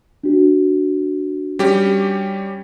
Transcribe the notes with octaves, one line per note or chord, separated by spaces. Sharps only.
D4 F#4
G3 C#4 G4